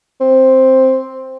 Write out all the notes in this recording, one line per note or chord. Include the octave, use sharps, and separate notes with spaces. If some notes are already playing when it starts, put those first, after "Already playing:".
C4